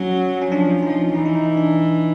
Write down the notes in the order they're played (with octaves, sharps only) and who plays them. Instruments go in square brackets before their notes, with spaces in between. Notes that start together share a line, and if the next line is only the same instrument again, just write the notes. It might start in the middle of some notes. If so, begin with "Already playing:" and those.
Already playing: [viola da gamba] F#3 [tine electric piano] C#4
[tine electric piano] C#4
[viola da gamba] F3 [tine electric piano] D4
[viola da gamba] F3 [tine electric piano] D#4
[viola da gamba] E3 [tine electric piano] D#4
[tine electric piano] E4
D#4
D4